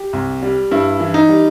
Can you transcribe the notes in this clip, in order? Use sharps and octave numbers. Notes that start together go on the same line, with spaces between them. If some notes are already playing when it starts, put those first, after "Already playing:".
Already playing: G4
C2
G3
G2 E4
E3
D#4
G3